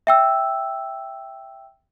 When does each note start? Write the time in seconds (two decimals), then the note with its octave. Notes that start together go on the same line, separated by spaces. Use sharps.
0.07 E5 G5 E6